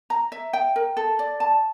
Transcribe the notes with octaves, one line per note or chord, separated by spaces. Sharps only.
A#5
E5
G5
A#4
A4
D5
A5